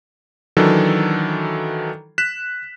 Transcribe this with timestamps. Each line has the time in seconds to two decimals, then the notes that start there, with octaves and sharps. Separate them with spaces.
0.57 D#3 E3 F#3 D4 A4
2.18 F#6 B6 E7